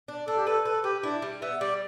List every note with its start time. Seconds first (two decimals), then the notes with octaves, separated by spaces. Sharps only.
0.08 D4
0.27 D4 A4
0.37 G4
0.46 A4 B4
0.65 A4 B4
0.84 G4 B4
1.03 D4 E4
1.22 G3
1.42 B3 E5
1.61 G3 D5